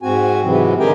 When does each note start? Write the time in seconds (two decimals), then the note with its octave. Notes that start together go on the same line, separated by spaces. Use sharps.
0.02 G#2 C4 F#4 G#5
0.44 G#2 C3 E3 F#3
0.80 D3 D#3 G4 G#4 A#4 G5